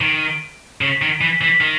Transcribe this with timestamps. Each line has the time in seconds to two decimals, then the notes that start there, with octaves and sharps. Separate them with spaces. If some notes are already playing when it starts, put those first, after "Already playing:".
0.01 D#3
0.81 C#3
1.02 D#3
1.21 E3
1.41 E3
1.61 D#3